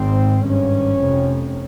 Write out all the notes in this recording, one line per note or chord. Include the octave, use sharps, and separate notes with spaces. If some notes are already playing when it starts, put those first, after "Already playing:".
Already playing: G#1 G#2 C4
G#1 G2 C#4
F1 F2 C3